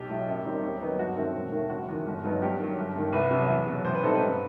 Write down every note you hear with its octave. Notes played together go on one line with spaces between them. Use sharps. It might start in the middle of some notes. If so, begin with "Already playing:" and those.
Already playing: B1 G4
A2 F#3
F#2
D#3 G3 C4 D#4
D#2
D#3 F#3 B3 D#4
G1 F#4
F#2 D#3 A3 C4
E1
D#2 D#3 A3
F#1 F#4
E2 D#3
G1
G2 F#3 B3 D#4
G2 G4
D#3 F#3
G1
G2 D#3
C2 B4
C3 F#3
E2
B2 F#3
A1 C5
B4
A2 G3 C4 D#4 A4
B4
G2